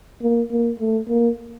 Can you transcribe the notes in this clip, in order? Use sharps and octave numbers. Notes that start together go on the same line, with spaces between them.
A#3
A#3
A3
A#3